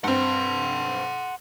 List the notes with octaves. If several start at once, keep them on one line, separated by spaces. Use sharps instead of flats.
G2 C4 F#5 C6